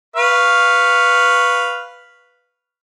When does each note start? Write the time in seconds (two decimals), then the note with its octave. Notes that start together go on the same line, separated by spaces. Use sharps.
0.16 B4 F5 C#6